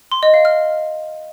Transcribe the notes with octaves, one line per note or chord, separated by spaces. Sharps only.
C6
D#5
F5
F6